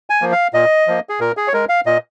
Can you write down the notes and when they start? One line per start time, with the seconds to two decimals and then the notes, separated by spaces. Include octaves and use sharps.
0.10 G#5
0.21 F3 A#3
0.32 F5
0.53 A#2 D#5
0.87 F3 A#3
1.09 G#4
1.20 A#2 A#4
1.37 G#4
1.48 C#5
1.54 G#3 A#4
1.69 F5
1.86 A#2 D#5